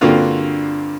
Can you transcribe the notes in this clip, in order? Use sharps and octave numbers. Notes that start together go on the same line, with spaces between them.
G2 D3 A#3 C4 F4 F#4